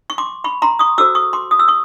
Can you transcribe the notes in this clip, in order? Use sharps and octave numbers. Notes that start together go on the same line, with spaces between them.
C#6
C6 D6
B5 C#6
A#5 C6
C#6 D#6
F#4 A4 C5 D6 E6
C#6 D#6
C6 D6
D#6
E6
C#6 D#6